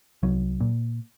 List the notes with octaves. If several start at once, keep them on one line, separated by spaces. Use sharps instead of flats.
C2 F#3
A#2